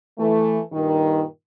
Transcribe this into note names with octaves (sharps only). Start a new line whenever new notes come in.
E3 A3
G2 A#2 D#3